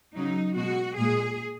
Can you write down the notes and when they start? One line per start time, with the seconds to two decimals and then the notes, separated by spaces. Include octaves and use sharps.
0.15 C#3 F#3 D#4
0.56 B2 G#3 F#4
0.97 A#2 G#3 G#4